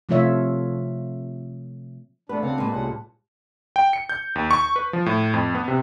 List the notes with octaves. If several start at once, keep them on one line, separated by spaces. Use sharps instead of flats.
C3 F3 A3 F4 C#5 E5
A3 B3 D4 B4
D2 C#3 C4 D4 B4 F5 F#5 A5
A#2 G#3 A#3 B4 F#5
C2 A2 C#4 F4 B4 F#5
G5
C#7
G6
D#2
C#6
B4
F3
A2
F2
B3
C3